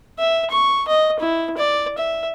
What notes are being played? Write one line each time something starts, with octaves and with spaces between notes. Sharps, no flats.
E5
C#6
D#5
E4
D5
E5